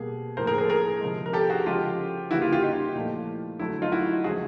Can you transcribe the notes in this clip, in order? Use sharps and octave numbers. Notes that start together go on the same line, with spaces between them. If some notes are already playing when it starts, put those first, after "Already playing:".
Already playing: B2 G3 A#3 G#4
A2 F3 A#3 A#4 C5
G#4 A#4
G#4 A#4
A4
G#4 A#4
C3 F3 G#3
A#4
G4 A4
F#4 G#4
C#3 F3 G#3 F4 G4
C#3 E3 G3 A#3 E4 F#4
F4 G4
F4 G4
D#4 F4
A#2 F3 A3
D3 F#3 A3 E4
D#4 F4
E4 F#4
C#3 F3 G#3 F#4 G#4